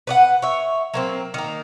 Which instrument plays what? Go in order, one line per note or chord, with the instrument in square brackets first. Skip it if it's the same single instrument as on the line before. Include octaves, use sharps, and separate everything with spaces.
[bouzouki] B4 D5 F#5
C#5 E5
F#3 A#3 C4
D#3 A#3